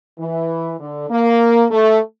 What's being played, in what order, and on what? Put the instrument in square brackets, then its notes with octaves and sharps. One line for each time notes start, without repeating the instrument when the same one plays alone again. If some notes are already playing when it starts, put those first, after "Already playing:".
[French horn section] E3
D3
A#3
A3